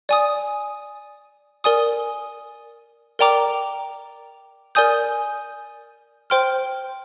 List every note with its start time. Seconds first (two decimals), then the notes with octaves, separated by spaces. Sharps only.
0.09 D5 G#5 D#6
1.64 A#4 D5 G#5 D#6
3.19 A#4 D5 G5 A#5 D6
4.75 A#4 D5 G#5 D#6 G6
6.30 C5 G5 C6 F6